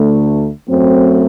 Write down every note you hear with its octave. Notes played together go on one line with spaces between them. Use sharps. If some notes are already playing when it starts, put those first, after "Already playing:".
Already playing: D2 D3 A3
F#2 F#3 A3 C4